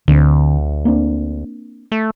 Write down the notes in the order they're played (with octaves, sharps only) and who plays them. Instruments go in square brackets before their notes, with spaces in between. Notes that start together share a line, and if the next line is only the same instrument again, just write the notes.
[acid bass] D2 [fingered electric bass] D3 C4
[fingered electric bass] A#3 C4 D4
[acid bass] A3